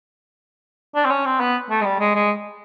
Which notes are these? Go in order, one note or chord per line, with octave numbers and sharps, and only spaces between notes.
D4
C4
C#4
C4
B3
A3
G#3
G3
G#3
G#3